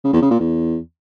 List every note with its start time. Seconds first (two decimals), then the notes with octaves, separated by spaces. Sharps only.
0.04 C#3
0.13 E2
0.22 C#3
0.31 A#2
0.40 E2